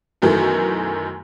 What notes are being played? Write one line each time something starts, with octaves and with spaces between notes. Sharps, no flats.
B1 F#2 D#3 E3 A3